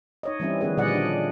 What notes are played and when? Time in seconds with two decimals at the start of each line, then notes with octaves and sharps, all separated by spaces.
0.23 D#4 C#5 D#5
0.40 E3 G3 C4 C#4 E4
0.61 D#3 F3 B3 C#4 G#4 B4
0.77 A#2 D3 G3 D5 D#5 F#5
0.94 D4